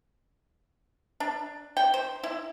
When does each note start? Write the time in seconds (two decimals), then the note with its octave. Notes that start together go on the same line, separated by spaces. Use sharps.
1.20 D4
1.77 G5
1.94 C5
2.23 E4